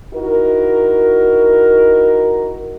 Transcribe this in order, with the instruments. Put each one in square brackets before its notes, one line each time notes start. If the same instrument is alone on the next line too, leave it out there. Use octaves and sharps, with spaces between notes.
[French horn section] D#4 E4 F#4 A#4